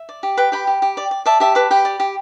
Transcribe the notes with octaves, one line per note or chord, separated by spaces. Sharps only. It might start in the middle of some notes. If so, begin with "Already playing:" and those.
Already playing: E5
D5
G4
B4 G5
G4 G5 B5
G4
G4
D5
D5
D5 E5 A5
G4 E5 A5
B4 A5 D6
G4 G5 B5
D5
G4